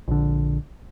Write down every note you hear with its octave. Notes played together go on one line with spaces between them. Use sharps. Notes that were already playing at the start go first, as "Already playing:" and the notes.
A#1 D3